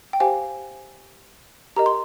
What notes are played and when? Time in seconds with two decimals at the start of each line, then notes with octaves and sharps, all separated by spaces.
0.13 G5
0.20 G4 C5 F5 G#5
1.76 G4 A#4 D#5 A#5
1.86 C6